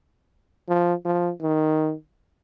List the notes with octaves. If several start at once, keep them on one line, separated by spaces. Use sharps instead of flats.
F3
F3
D#3